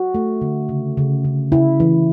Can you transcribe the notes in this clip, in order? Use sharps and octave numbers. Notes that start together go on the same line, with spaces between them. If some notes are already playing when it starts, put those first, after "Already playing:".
Already playing: F#4
A3
D3
C#3
C#3
C#3
C#3 E4
E3